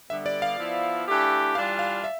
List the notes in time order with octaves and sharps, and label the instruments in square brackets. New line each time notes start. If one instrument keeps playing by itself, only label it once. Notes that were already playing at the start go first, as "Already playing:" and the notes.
[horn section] D3 G3 B3 [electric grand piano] E5
[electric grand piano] D5
F5
[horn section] F3 B3 E4
E3 A3 D4 G4
[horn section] E3 G3 D4 F4 [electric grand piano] F5
[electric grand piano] F5
E5